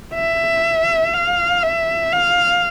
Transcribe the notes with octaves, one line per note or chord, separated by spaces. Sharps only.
E5
F5
E5
F5